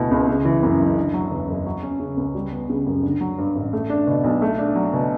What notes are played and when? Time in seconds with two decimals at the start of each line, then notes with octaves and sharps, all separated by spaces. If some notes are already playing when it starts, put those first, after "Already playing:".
Already playing: D2 B2 A3 E4
0.11 C#2
0.27 C#3
0.45 E3
0.63 F#2
0.79 F#1
0.97 D3
1.14 F#3
1.31 E2
1.48 F#1
1.66 F#3
1.83 C#4
2.00 C#3
2.17 C#2
2.35 G3
2.52 B3
2.70 C#3
2.86 F#2
3.03 D3
3.21 F#3
3.38 G2
3.56 A1
3.73 A3
3.90 D4
4.07 B2
4.24 B1
4.42 A3
4.58 D4
4.75 F#3
4.93 B2